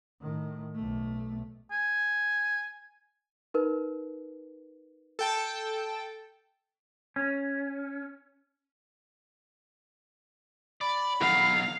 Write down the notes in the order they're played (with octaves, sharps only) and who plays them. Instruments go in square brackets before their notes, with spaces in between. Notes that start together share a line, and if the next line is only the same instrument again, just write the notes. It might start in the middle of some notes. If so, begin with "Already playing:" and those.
[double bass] A2 D#3
B1 A3
[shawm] G#5
[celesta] D#4 A#4 B4
[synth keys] A4 G5 A5
[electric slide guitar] C#4
[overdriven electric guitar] D5 [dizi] B5
[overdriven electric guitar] B2 F#3 [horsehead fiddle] F5